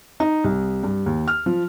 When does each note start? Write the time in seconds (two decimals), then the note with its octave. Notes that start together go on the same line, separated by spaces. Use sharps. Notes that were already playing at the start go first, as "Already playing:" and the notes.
0.20 D#4
0.44 C2
0.83 G2
1.06 D#2
1.28 F6
1.46 F3